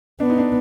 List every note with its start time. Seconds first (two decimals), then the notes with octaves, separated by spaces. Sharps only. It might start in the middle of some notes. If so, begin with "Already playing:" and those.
0.20 B3 D4
0.30 D#4
0.38 D4